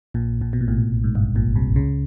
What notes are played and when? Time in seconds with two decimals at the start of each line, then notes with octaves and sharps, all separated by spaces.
0.14 A#1 A#2
0.41 A#1 A#2
0.53 B2
0.61 A#2
0.68 A1 A2
1.04 G#2
1.15 G1 G2
1.35 A#1 A#2
1.56 C2 C3
1.76 C#2 C#3